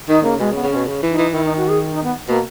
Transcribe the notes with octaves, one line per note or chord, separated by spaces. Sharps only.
D#3 D#4
C#3 A#3
B2 G#3
C#3
B3
C#3
B2 C#4
C#3
E3
D#4
E3
D#3 E4
D#4
F#4
G#4
D#4
B3
B2 A#3